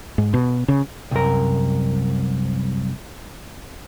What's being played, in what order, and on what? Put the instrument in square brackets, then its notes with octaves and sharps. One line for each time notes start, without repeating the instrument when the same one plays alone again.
[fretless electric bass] G#2
B2
C#3
[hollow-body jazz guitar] C2 F#2 A#4